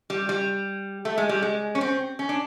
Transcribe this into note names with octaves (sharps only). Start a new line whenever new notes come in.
G3
G3
A3
G#3
G3
G#3
C#4
C4
C#4
D4